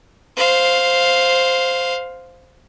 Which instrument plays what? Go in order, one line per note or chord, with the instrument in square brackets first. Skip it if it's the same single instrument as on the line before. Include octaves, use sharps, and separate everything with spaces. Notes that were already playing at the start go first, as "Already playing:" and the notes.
[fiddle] C5 F5